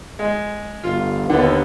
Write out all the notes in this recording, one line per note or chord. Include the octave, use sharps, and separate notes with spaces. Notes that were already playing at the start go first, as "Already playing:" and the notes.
G#3
G1 F4
D#2 D3 B3